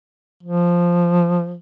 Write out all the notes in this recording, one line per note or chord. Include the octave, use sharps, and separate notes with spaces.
F3